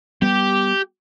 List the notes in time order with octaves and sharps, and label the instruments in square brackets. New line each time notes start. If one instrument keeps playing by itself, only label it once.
[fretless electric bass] G3 B3 [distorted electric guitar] G4